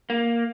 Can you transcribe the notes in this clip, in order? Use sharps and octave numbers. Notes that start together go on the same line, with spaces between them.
A#3